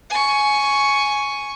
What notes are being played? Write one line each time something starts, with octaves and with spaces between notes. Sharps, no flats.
G#5 C#6